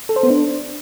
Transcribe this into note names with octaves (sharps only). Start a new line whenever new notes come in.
A4
C5
B3
D4